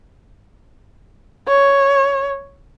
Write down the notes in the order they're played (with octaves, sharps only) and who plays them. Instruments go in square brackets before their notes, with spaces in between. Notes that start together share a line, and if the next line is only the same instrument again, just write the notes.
[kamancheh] C#5